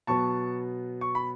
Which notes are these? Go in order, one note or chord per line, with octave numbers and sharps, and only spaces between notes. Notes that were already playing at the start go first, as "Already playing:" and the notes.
B2 F#3 B3 A5 C#6
C#6
B5